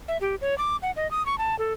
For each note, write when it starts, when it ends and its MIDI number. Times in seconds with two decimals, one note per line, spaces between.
0.08 0.17 76
0.21 0.35 67
0.41 0.57 73
0.58 0.76 86
0.82 0.91 78
0.96 1.09 75
1.11 1.25 87
1.26 1.38 85
1.38 1.58 81
1.59 1.73 69